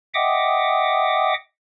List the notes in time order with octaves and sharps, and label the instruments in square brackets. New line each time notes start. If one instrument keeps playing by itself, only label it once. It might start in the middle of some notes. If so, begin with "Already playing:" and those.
[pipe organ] D#5 E5 F#5 G5 D6 D#6